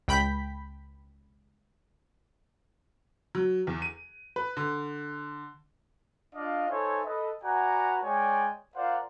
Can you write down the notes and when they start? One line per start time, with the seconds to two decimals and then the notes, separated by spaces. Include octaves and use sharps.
0.08 C#2 G5 B5 G6 B6
3.35 F#3
3.67 E2
3.82 D#7
4.36 B4
4.57 D3
6.36 D4 F4 D5 D#5 F5
6.70 D#4 A4 C5 C#5 E5 G#5
7.06 A4 B4 D#5
7.44 F#4 B4 D5 F#5 G#5 A#5
8.03 G#3 C#5 D5 G5 G#5
8.76 F4 A#4 C5 D5 F5 F#5